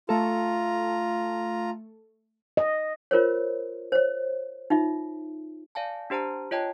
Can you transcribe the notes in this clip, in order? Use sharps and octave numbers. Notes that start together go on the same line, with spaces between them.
A3 F4 A4 A#5
D#5
F4 A#4 C5 C#5
C5 C#5
D#4 F4 E5
D5 F5 G#5 A5
D4 G4 C5 A5 A#5
F4 C#5 D#5 G5 A5